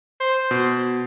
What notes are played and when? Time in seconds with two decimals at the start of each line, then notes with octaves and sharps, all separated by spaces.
0.20 C5
0.51 B2